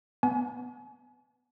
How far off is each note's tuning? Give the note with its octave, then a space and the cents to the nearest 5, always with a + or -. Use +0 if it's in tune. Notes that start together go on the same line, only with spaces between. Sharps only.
B3 +0 G#5 +35